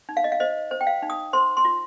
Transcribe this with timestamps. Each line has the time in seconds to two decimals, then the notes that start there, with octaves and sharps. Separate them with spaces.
0.09 D#4
0.17 F5
0.24 D#5
0.32 F5
0.40 C5 D#5
0.71 C5
0.81 G5
0.87 F5
1.02 D#4
1.10 D#6
1.33 C5 C6
1.57 C6
1.65 F4